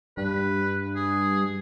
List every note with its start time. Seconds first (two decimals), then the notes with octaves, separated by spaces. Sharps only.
0.17 G2 B4
0.96 G#4